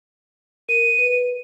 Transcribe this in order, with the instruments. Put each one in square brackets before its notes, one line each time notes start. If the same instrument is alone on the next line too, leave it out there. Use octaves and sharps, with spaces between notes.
[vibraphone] A#4 [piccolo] D#7
[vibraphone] B4